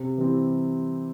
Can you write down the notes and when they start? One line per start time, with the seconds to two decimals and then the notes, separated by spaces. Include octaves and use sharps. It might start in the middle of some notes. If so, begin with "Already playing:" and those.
Already playing: C3
0.18 E3 G3 C4